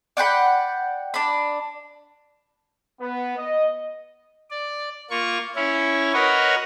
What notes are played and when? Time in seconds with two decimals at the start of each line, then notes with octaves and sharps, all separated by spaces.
0.17 D5 F#5 G5 B5
1.14 D4 B5
2.99 B3
3.37 D#5
4.50 D5
5.10 A#3 F4 C#6
5.56 C#4 E4 C#5
6.14 F#4 A#4 B4 C#5 D#5